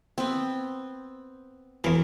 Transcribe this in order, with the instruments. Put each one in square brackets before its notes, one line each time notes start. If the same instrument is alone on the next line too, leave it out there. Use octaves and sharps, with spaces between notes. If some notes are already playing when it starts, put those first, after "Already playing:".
[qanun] B3 C4
[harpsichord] E2 E3 [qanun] A#4